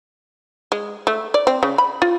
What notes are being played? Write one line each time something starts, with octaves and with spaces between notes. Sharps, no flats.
G#3
A3
D5
C4
C#3
B5
F4